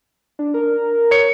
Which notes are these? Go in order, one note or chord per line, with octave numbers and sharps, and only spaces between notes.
D4
A#4
C#5 C#7